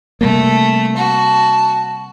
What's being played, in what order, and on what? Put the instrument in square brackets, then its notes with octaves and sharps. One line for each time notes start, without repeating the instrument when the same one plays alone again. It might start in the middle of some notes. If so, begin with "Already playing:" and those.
[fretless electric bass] C3 G3 A#3 [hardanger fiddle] A3
[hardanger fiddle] F#4 [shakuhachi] A5